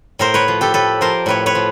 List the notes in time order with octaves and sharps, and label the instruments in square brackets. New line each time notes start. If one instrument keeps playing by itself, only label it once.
[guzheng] A2 A#4 C5
B4 C#5
F3
G4 A4
A2 A4 B4
F3 A#4 C5
A2 B4 C#5
B4 C#5
F3